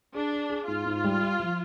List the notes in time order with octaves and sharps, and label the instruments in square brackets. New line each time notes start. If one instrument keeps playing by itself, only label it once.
[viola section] D4 [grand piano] G#4
[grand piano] G#4
G#4
[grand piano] G#2 [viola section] F4
[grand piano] G#2
G3
G4
F3